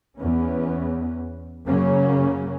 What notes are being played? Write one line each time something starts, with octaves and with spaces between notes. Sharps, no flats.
E2 B3 C#4
F#2 C#3 F#3 A#3 C#4